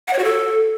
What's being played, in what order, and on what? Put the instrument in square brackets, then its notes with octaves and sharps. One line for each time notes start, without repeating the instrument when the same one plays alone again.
[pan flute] F#5
C#5
F#4
A4